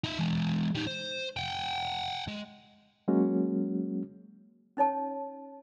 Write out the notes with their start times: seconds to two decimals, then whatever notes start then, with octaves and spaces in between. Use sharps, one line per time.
0.04 D#4 E5
0.18 E3 G#3
0.75 G3 D#4
0.87 C5
1.37 F#5 G5
2.28 G#3
3.08 F#3 G#3 A#3 C#4 F#4
4.77 C#4 D#4 C#5 A5